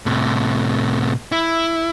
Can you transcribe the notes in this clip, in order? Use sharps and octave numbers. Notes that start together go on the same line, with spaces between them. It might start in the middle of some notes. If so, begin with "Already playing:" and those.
A2 C3
E4